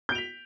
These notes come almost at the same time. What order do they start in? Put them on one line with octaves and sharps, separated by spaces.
G6 D7 F7 B6